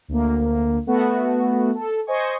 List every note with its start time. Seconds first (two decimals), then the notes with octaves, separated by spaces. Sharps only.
0.08 D2 A#3
0.87 A3 B3 F#4
1.74 A4
2.07 C5 D#5 G#5 C#6